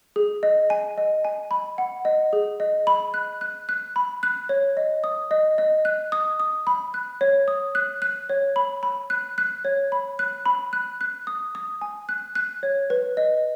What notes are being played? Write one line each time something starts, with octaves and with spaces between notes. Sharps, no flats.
G#4
D#5
G#5
D#5
G#5
B5
F#5
D#5
G#4
D#5
B5
F#6
F#6
F#6
B5
F#6
C#5
D#5
D#6
D#5
D#5
F#6
D#6
D#6
B5
F#6
C#5
D#6
F#6
F#6
C#5
B5
B5
F#6
F#6
C#5
B5
F#6
B5
F#6
F#6
D#6
D#6
G#5
F#6
F#6
C#5
B4
D#5